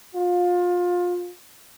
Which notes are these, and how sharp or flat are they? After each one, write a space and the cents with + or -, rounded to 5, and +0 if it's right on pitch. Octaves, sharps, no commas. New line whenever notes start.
F4 +25